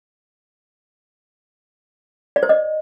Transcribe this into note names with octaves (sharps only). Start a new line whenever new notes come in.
D5
C5
D#5